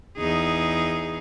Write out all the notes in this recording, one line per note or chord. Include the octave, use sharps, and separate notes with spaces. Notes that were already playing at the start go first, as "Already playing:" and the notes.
E2 D#4 G#4